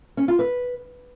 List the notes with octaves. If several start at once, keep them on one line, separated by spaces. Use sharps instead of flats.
C#4
F4
B4